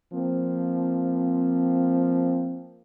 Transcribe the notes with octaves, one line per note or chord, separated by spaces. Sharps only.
F3 A#3 C4